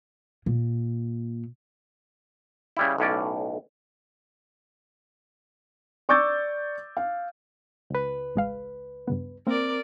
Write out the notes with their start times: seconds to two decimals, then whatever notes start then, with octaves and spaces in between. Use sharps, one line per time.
0.46 A#2
2.77 C#3 G3 E4
2.98 B1 A2 C#4 D5
6.09 D5 C#6 D6 E6 G6 A6
6.97 F5
7.90 C#2 B4
8.35 A1 G#3 F5
9.07 G2 C#3 B3
9.47 A#3 C4 A#4 D5